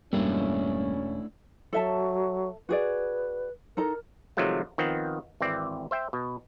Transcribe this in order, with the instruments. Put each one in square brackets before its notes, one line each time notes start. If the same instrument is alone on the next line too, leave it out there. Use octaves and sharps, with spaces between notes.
[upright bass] E1 [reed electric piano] G2 G3 A#3 [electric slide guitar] A3 D4 E4 [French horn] C#4
[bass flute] F#3 [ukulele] A4 E5 A5
[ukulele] F#4 G#4 D5 [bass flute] B4
[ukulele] D#4 A4 A#5 [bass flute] A#4
[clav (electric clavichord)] C3 D#3 F3 F#3 G#3 A3
D#3 F3 B3 C4
G#1 E3 C4 D5
C5 E5 G5
B2